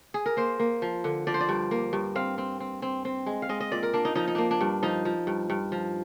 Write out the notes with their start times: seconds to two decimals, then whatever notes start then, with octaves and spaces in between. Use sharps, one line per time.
0.14 G#4
0.26 A#4
0.37 A#3 C5
0.59 A#3
0.82 F3
1.04 D3
1.27 F3 D5
1.34 C5
1.41 D5
1.49 G2
1.71 A#3
1.93 G2
2.15 C4 F5
2.38 C4
2.60 C4
2.82 C4
3.05 C4
3.26 G#3
3.42 F5
3.49 G#3 D#5
3.61 D#5
3.72 A#2 D5
3.83 A#4
3.93 A#3 D4
4.05 D#4
4.15 F3 D#4
4.28 D#4
4.35 A#3 D4
4.51 D4
4.61 G2
4.83 F3 D#4
5.05 F3
5.27 G2
5.50 G2
5.72 F3